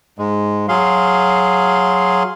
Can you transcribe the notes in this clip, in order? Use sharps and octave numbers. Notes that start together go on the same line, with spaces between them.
G#2 G#3
F#3 G#4 F5 C6